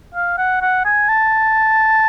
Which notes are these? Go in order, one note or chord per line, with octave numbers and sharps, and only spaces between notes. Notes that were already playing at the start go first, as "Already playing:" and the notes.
F5
F#5
F#5
G#5
A5